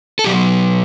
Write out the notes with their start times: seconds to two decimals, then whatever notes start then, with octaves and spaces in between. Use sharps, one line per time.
0.19 A4
0.24 B2 F#3 G4